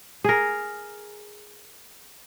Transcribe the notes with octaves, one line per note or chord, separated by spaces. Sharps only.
G#4 A#4